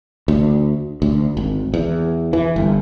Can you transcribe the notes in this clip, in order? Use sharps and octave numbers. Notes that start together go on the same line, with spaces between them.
D2
D2
G#1
E2
E3
G1